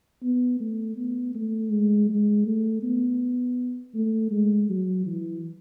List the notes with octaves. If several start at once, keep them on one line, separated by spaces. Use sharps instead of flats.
B3
A3
B3
A3
G#3
G#3
A3
B3
A3
G#3
F#3
E3